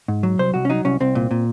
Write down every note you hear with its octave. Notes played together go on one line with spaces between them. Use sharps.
G#2
F#3
C2 C5
C2 F#4
C#4
F#3 D#4
C2 C#4
C2 C4
A#2
A#2